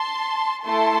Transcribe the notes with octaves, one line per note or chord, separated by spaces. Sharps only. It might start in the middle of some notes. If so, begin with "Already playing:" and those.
Already playing: A5 C6
A3 E4 A4 A5 C6